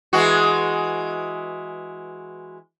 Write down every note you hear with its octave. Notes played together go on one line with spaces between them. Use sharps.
E3 G#3 F#4